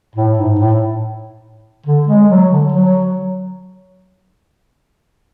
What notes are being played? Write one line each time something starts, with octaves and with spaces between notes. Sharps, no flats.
A2
G#2
A2
D3
G#3
F#3
D3
F#3